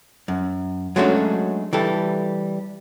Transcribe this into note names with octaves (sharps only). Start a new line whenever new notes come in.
F#2
F#3 G#3 A3 C#4 D4 F#4
E3 G3 A4